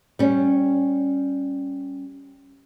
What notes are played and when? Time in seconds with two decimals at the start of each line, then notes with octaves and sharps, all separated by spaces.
0.19 G3 C#4